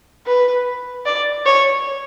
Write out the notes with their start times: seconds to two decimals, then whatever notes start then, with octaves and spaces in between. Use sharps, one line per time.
0.27 B4
1.06 D5
1.46 C#5